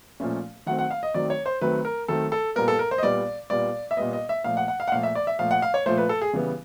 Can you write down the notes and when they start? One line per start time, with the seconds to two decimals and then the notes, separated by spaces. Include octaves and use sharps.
0.20 A#2 F3 A3 C#4
0.66 D#3 F#3 A3 C4 F#5
0.79 F#5
0.91 F5
1.03 D#5
1.14 D#3 F#3 A3 C4 D5
1.30 C#5
1.46 C5
1.61 D#3 F#3 A3 C4 B4
1.85 A#4
2.08 D#3 F#3 A3 C4 A4
2.32 A4
2.56 A#2 G3 B3 A#4
2.68 A4
2.79 A#4
2.91 C5
2.98 D#5
3.02 A#2 G3 B3 D5
3.50 A#2 G3 B3 D5
3.91 E5
3.97 A#2 G3 B3 D#5
4.13 D#5
4.29 E5
4.44 A#2 F3 A3 F5
4.57 F#5
4.68 F#5
4.80 F5
4.88 F#5
4.92 A#2 F3 A3 F5
5.03 E5
5.15 D5
5.27 E5
5.39 A#2 F3 A3 F5
5.51 F#5
5.62 F5
5.74 C#5
5.86 A#2 F3 A3 C5
5.98 B4
6.09 A4
6.21 G#4
6.33 C#3 E3 G3 B3